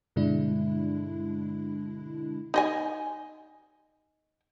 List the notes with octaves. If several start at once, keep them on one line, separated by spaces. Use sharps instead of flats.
G2 B2 D3 G#3 D4 E4
D#4 D#5 G#5